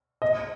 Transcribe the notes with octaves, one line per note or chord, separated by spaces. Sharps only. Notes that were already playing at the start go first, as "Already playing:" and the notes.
D#5